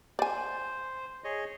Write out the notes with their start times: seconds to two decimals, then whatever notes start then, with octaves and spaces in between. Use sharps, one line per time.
0.19 C5 D5 G#5
1.24 G#4 C#5 D#5